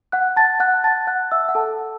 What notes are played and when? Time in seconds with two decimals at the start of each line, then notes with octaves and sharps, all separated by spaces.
0.12 F#5 F#6
0.36 A5 A6
0.60 F#5 F#6
0.84 A5 A6
1.07 F#5 F#6
1.31 E5 E6
1.49 F#5
1.55 A4 A5